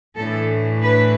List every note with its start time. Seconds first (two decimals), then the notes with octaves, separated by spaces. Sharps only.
0.17 A2 E3 D4 A4
0.81 B4